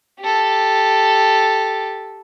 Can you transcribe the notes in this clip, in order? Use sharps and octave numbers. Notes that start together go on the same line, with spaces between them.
G4 A4